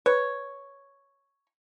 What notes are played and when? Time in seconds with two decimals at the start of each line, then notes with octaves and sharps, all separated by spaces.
0.06 B4 C#5